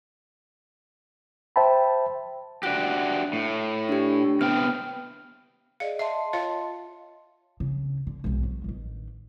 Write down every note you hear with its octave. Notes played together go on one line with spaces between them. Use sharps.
C5 E5 G5 A5 B5
D4 F#4 G4 F#6 D7
A2
D4 G4
C3 B3 G5 F6
G#4 D5 D#5 F5
D#5 E5 A5 C6
F4 C#5 F5
C#3
D3
B1 G#2
F#3
A1 D#3